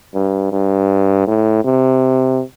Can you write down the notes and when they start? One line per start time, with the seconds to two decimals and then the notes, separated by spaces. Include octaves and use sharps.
0.15 G2
0.52 G2
1.27 A2
1.64 C3